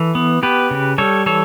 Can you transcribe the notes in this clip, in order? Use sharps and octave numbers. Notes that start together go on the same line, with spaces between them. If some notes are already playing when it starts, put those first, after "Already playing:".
Already playing: E3 A4
B3
B3 G4 B4
C#3
G3 A4 C#5
E3 A4 C#5